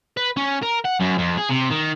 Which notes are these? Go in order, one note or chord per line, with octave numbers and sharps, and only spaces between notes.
B4
C#4
A#4
F#5
F#2
F2
G#4
C3
D#3